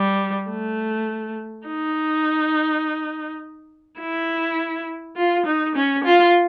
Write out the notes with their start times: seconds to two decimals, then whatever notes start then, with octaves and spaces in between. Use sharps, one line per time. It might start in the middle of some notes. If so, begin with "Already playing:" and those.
Already playing: G3
0.50 A3
1.67 D#4
4.00 E4
5.16 F4
5.46 D#4
5.76 C#4
6.04 F4